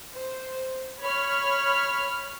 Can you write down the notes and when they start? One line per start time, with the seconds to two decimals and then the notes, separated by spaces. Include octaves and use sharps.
0.17 C5
1.03 C#5 B5 F6